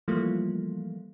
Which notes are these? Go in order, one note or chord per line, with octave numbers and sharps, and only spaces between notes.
E3 F3 G3 A3 A#3 F4